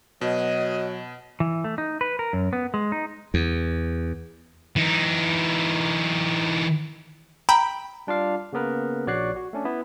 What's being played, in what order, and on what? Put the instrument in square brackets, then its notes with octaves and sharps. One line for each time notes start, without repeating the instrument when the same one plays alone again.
[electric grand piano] B2 [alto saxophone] F#3 [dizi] D#5
[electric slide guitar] E3
A3
D#4
B4
A#4
F#2
B3
G#3
D#4
[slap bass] E2
[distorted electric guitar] E3 D#4
[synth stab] G5 B5 [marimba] A#5
[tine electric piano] G3 D4 F4 D5 F5
C#3 A#3 B3 A#4 B4
A#1 F#4 C#5 D5 F#6 C7
F#4
A3 C#4 D4
B3 E4